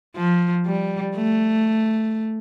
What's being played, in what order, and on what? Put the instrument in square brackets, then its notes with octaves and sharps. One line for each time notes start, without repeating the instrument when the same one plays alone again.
[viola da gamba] F3
G3
A3